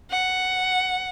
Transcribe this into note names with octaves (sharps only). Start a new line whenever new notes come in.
F#5